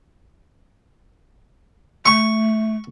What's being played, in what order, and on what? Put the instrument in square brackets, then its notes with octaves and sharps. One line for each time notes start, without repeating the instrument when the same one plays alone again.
[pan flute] A3 [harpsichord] C#6